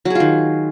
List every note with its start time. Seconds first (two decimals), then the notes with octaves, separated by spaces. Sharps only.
0.05 F#3
0.10 G#4
0.15 F4
0.20 D#3